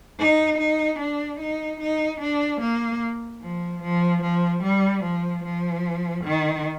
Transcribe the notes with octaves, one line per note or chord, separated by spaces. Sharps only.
D#4
D#4
D4
D#4
D#4
D4
A#3
F3
F3
F3
G3
F3
F3
D#3